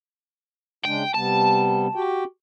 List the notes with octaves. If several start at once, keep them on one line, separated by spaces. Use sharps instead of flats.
C#3 G#3 D4 G5
C3 G3 B3 A5
F#4 G4 G5